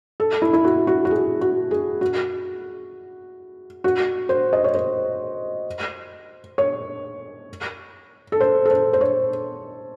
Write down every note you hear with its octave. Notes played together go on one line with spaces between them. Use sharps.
A4
E4
E4
F#4
F#4
F#4
G#4
F#4
G#4
F#4
F#4
C5
D#5
C#5
C5
C#5
A4
C5
A4
C5
C5
C#5